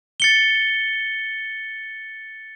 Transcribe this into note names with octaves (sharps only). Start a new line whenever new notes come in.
A6 C#7 G7